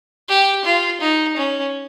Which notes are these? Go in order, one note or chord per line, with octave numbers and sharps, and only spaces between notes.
G4
F4
D#4
C#4